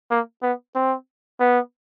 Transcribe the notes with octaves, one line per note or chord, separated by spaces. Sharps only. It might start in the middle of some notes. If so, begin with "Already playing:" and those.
A#3
B3
C4
B3